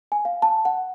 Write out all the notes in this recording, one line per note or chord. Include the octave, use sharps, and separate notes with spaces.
G#5
F5
A5
F#5